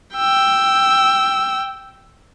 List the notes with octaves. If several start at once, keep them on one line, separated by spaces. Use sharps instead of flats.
G5 E6